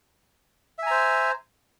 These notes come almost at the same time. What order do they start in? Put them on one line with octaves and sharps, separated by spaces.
E5 G#5 A#5 C5